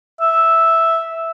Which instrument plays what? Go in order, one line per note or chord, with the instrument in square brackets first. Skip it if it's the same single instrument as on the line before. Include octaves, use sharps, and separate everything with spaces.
[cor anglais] E5